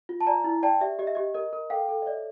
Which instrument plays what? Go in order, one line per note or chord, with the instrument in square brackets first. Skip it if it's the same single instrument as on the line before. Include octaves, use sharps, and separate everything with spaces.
[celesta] F4
A5
D5 G#5 A#5
E4
D5 G5 A5
G4 D5 E5
G4 D#5
E5
G4 D#5
A#4 D#5
A#4
A4 F5 G5
A4
D#5
C#5 D5 E5